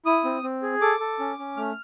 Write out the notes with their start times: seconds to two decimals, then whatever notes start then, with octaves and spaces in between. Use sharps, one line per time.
0.06 E4 D#6
0.24 C4
0.43 C4
0.62 G#4
0.81 A4 D6
1.00 A4
1.19 C#4
1.38 C#4
1.57 A3 F6